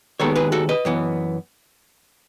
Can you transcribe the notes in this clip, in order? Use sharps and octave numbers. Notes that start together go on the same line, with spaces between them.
D#2 D#3 G#3 B3 A4 C#5
G#4 B4
F#4 A4
B4 D#5
F#2 E3 B3